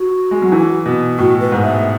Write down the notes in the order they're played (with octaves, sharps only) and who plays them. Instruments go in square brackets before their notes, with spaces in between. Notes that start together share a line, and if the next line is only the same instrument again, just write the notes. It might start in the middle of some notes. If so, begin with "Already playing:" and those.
Already playing: [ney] F#4
[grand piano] G#3
F#3
E3
B2
[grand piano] A2 [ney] F#4
[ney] B4
[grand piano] G#2
[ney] E5